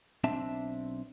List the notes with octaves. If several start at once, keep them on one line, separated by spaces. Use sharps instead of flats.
B1 C4 D4 E5 A5